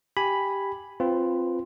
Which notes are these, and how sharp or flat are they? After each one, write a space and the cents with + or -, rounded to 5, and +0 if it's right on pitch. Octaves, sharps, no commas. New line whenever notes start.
G4 +0 G#5 +0 B5 +0
C4 +5 F4 +0 B4 +20